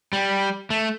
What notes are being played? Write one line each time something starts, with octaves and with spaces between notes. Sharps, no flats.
G3
A3